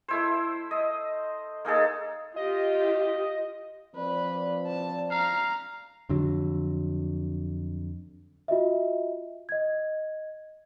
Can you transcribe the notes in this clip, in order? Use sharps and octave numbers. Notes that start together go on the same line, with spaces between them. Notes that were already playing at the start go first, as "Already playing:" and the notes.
A3 E4 C5
D#5
A#3 D#4 G#4 A4
F4 G4 D#5
F3 C4 B4 D5
A5
F5 A#5
F2 D3 F#3
F4 F#4 D#5 E5
D#5 G#6